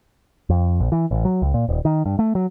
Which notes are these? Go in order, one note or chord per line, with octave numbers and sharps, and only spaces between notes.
F2
A#1
E3
A1
F#3
C#2
A#2
D#1
D#3
G2
A3
F#3